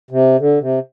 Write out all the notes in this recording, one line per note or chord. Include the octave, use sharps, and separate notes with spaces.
C3
D3
C3